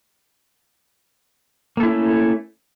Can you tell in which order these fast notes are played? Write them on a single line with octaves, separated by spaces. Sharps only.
A#3 A4 E4 C#4 A3